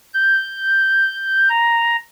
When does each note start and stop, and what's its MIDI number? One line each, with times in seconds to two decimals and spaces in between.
0.14 1.49 91
1.49 1.97 82